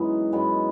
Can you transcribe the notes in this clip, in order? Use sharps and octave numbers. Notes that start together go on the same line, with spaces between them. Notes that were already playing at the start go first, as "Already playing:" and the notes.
Already playing: F#2 E3 G#3 B3 D#4
F#2 E3 G#3 B3